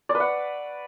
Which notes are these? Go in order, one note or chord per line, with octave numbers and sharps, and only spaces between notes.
D5
B4
F#5